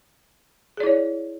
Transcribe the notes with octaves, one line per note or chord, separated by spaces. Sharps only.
E4 G#4 C#5 D5